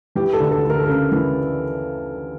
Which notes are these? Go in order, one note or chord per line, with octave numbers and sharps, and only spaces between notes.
E3 G4
A4
D2
A4
D2
A#4
A4
C#3 A#4
E3